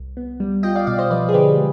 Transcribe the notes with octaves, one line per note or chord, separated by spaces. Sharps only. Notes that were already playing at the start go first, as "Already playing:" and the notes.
Already playing: C2
B3
G3
F4 D#5 G5
D5 F5
B2 D5 F5
C5 D#5
F3 B4 D5
G#4
D3 G4 B4
G#3